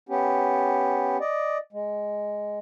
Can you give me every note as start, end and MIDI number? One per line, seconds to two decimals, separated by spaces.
0.09 1.17 59
0.09 1.17 61
0.09 1.17 67
1.20 1.58 74
1.20 1.58 75
1.73 2.59 56